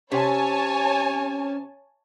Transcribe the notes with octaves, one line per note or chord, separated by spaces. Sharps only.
C3 C#4 C#5 G#5 A5